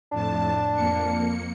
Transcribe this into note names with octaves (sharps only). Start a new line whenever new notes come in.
F2 A2 D4 A5
F2 A#3 C#7